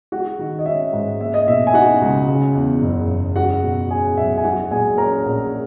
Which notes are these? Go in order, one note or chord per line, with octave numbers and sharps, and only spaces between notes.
G#3 F#4 F#5
D#3
D#5
C#4 E5
G#2
A#3 E5
D#5
B2 E5
G#5
D#4 F#4 F#5
C#2
C#3
E2
F#1
F#1
G#3 F#4 F#5
B2
C#4 G#4 G#5
B1 E5
G#5
F#3 F#4 F#5
A#2 G#4 G#5
C#4 A#4 A#5
A#1